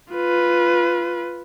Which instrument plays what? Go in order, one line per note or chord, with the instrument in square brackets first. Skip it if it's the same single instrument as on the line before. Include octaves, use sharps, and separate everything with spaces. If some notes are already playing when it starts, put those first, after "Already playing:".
[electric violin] F4 B4